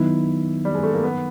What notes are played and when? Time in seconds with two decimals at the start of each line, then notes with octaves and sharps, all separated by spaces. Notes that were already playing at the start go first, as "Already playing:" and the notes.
Already playing: D#3 F#3 B3 D#4 E4
0.65 G3
0.75 G#3
0.83 A3
0.94 A#3
1.04 B3